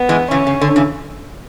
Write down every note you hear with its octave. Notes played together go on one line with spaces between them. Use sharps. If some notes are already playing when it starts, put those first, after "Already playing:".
Already playing: B3
E3 G#3
C#3 E3 C#4
C#3
D3
C#3 E3